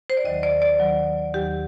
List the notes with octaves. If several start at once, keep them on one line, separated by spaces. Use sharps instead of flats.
C5
D5
D#2 D#3 F#3 D#5
D5
D5
D#2 D#3 F#3
D#2 D#3 F#3 G4